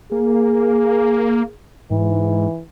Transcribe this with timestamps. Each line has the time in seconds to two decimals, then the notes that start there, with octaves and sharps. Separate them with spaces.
0.12 A#3 G#4
1.91 G#2 E3